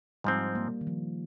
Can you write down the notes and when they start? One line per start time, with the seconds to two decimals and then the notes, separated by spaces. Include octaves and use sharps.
0.24 G#2 F3 G3 C4
0.55 A#3
0.81 D#3
0.87 F3